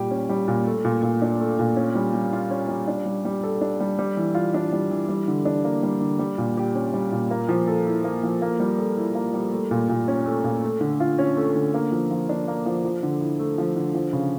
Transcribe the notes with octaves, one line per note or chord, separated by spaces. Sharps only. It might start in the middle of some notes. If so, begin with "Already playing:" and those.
Already playing: A#2 G3 G4
C#4
G3
A#2
A3
A#2
A#2
D4
A3
A#2
C#4
G3
G3
F4
C#4
G3
D4
G3
G3
A4
D4
G3
G3
E3
F4
D4
G3
E3
G3
D3
D4
A#3
G3
D3
G3
A#2
G4
C#4
G3
A#2
A#3
F3
A4
E4
A#3
F3
A#3
G3
A4
E4
A#3
G3
A3
A#2
A#2
C#4
A3
A#2
A3
D3
F4
C#4
A3
D3
A#3
F3
F3
D4
A#3
F3
F3
D3
E4
A3
F3
D3
F3
C#3